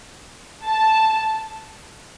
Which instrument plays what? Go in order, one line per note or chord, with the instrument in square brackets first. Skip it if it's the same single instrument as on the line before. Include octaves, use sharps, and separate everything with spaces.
[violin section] A5